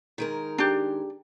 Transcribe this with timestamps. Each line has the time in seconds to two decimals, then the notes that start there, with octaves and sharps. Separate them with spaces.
0.18 D#3 G#3 A#4
0.58 D4 G4